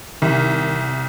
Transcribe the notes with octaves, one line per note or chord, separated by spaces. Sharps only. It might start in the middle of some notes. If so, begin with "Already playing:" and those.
C2 D#3